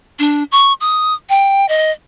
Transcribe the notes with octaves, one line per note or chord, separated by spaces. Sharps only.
D4
C#6
D#6
G5
D#5